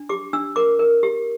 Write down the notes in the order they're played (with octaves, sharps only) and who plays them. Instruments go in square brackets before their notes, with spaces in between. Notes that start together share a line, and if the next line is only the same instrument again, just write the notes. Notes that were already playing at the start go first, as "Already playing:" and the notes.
Already playing: [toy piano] D4
G4 D6
D4 E6
A#4 D6
A#4
G4